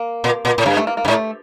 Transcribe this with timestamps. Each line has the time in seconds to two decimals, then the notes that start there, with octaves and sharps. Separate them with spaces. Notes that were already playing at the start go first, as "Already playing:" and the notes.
Already playing: A#3
0.24 A#2
0.45 A#2
0.58 A2
0.66 G2 A#3
0.77 A3
0.87 A#3
0.97 A#3
1.05 G2
1.08 A2 A3